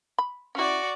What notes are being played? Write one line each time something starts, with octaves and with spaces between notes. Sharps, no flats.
B5
C#4 E4 F#4 D5